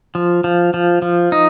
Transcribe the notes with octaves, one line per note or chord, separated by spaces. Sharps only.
F3
F3
F3
F3
D#4